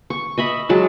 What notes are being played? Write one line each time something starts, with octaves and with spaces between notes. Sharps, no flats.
C#6
D#5 E5 B5
F#3 G#3 A5